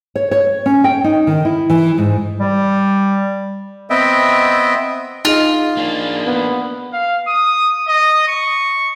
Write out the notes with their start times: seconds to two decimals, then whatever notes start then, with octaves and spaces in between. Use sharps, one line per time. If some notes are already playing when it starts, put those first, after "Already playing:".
0.15 C#5
0.31 C#5
0.66 C#4
0.84 G5
1.04 D#4
1.27 D#3
1.45 E4
1.70 E3
1.98 G#2
2.40 G3
3.90 B3 C4 D#5 E5 G5
5.25 D#4 F4 G#4 D#5
5.77 A#3 D4
6.26 B3
6.93 F5
7.27 D#6
7.88 D#5
8.28 C#6